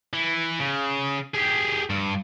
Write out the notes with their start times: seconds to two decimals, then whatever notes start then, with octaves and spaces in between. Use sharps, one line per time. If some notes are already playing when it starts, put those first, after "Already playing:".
0.13 E3
0.60 C#3
1.35 G4 G#4
1.90 G2